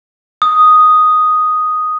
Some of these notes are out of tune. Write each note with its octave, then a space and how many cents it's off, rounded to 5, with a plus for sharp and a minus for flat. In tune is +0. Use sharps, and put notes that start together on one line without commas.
D#6 +0